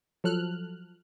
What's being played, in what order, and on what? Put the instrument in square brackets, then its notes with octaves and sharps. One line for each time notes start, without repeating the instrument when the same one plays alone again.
[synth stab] F3 F#3 A4 F6 F#6